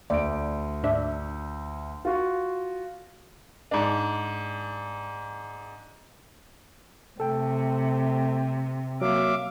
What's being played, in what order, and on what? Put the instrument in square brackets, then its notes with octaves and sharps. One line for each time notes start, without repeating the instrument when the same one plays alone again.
[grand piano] D2 D7 [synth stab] D5
[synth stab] G#2 D4 E5
[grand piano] F4 F#4
[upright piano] G#2 D4
[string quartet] C3 [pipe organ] A3 [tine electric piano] A4 G5
[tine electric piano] F#3 A#3 [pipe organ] E5 F5 D6